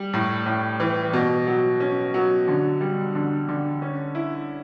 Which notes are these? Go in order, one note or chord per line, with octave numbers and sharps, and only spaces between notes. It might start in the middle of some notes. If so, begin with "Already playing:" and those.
Already playing: G3
A2
A2
E3
B2
F#3
C#4
F#3
D3
G3
D3
D3
C#4
E4